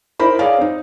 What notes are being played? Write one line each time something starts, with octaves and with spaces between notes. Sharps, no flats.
D#4 E4 A#4 C5 B5
G#4 C#5 D5 F5
C4 D#4